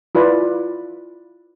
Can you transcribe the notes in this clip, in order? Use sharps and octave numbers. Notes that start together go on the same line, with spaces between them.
E4 F4 B4 D5 B5